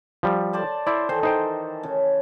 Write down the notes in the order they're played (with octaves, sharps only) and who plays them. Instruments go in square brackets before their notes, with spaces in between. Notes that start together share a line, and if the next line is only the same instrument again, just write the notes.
[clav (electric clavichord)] F3 G3
[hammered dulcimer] C5 D5 A5
[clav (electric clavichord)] E4 D5 [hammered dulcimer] C5
[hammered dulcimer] D#3 E3 A4 [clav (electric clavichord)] C5
[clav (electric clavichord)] D#4 C5 G5
[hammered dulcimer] C#3